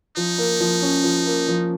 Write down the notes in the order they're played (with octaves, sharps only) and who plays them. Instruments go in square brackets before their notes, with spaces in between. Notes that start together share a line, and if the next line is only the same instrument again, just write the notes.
[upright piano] F3 [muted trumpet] D#4
[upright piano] A#3
F3
C#4
F3
A#3
F3